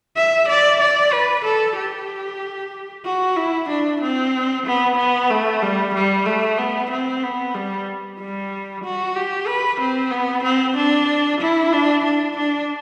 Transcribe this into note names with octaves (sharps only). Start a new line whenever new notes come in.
E5
D5
D5
B4
A4
G4
F#4
E4
D4
C4
B3
B3
A3
G3
G3
A3
B3
C4
B3
G3
G3
F#4
G4
B4
C4
B3
C4
D4
E4
D4
D4
D4